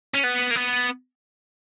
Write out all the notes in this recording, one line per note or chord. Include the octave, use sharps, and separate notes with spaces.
C#4
B3
A#3
B3